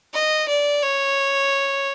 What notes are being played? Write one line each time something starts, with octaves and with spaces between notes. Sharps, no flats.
D#5
D5
C#5